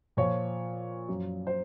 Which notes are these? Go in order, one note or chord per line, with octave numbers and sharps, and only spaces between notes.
A#2 F3 C#5
F#2 F3
C5